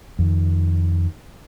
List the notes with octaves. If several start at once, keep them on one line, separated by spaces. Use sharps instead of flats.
F2 D#3